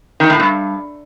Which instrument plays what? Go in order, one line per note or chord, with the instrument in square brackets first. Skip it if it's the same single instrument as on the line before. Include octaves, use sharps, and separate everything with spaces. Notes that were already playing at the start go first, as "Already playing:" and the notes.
[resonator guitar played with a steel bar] D#3
A2
G2